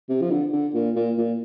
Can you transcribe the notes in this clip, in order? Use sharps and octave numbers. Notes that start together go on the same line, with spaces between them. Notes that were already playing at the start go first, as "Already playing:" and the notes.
C3
F3
D3
D3
A#2
A#2
A#2